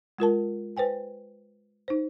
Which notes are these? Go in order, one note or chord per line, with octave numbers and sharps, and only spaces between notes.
G#3 F4 A#4 A5
B4 C5 G5 G#5
D#4 C5